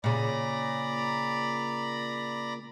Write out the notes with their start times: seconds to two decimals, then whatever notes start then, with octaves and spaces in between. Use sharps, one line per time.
0.04 A#2 C#3 D5 A#5 B5